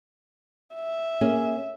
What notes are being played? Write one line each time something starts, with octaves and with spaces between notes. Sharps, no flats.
E5
A#3 C#4 G#4